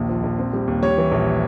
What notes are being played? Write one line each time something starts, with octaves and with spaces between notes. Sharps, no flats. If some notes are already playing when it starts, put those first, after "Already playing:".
Already playing: A#1 D#2
F3
A#1
C4
G3
D#2
G3 C#5
E3
A#1